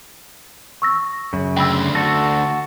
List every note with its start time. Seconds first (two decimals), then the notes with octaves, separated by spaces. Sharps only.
0.82 C#6 E6 A#6
1.33 F#2 C#3
1.57 D2 G5 B5 E6
1.95 F#4 A4 A#6